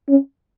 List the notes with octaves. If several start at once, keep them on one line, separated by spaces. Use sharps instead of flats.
C#4